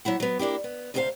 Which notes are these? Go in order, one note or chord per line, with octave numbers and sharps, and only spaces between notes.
F#3 A#3 E4 F#5
F#3 B3
A#3 D4 E4 G4
B3
D2 C3 F4 G#4 C5 F5